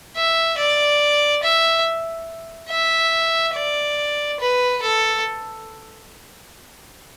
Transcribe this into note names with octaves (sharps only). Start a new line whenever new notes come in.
E5
D5
E5
E5
D5
B4
A4